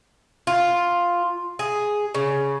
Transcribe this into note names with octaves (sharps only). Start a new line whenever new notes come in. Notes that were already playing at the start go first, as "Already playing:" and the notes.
F4
G#4
C#3